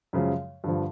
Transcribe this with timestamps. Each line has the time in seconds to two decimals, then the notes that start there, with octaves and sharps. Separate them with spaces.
0.13 F#2 C#3 F3 G#3
0.64 G2 D3 F3